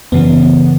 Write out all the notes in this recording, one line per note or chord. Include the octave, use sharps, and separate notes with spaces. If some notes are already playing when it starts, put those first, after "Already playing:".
F#2 C#3 E3 B3